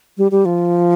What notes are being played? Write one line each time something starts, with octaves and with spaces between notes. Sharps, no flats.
G3
G3
F3